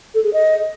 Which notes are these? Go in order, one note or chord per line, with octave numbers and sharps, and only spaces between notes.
A4
G#4
D#5